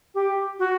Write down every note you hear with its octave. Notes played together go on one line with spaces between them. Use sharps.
G4
F#4